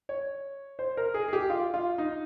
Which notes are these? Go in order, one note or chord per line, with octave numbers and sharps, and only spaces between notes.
C#5
C5
A#4
G#4
G#4
G4
F4
F4
D#4